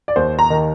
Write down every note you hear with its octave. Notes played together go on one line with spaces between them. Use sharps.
D5
D#2 C5
A#5
D#3